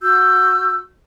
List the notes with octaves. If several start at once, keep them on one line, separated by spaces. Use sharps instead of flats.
F#4 E6 G6